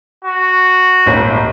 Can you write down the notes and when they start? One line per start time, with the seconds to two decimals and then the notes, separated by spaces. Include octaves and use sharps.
0.25 F#4
1.06 D#1 G#1 C#4